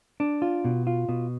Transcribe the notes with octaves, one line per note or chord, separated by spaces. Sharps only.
D4
F4
B2
F4
B2